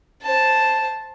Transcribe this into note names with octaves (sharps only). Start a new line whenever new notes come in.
C5 A5